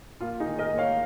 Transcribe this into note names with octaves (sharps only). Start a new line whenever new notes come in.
A#3 F4
D#4 G#4
D#3
A#4 D#5
A#3
C#5 F5